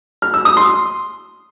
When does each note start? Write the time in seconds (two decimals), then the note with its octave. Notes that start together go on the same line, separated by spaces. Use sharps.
0.22 F6
0.34 E6
0.45 D#6
0.57 C6